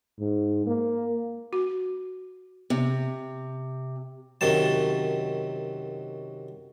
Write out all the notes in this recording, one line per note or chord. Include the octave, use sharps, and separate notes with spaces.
G#2
A#3
F#4
C3
F#2 C3 D#3 F#3 A5